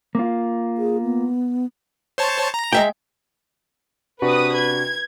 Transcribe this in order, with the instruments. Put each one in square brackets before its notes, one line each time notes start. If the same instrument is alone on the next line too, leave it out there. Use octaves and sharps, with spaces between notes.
[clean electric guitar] A#3 F4
[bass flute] G#4
B3
[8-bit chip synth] C5 C#5 A5
A#5
[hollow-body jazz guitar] G#3 E5 G5
[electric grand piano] C3 D4 F#4 [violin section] B4 D#6
[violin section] G#6